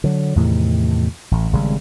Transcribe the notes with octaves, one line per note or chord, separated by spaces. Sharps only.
D3 F#3
E2 A2 C3 D#3
A1
G#1 C#3 G3